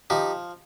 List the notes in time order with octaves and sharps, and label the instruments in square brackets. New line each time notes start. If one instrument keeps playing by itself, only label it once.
[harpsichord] F3 D#4 G4